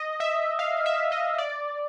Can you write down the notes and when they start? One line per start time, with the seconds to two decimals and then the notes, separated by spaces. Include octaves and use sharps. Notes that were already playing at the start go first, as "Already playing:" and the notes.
Already playing: D#5
0.20 E5
0.59 F5
0.86 E5
1.12 D#5
1.38 D5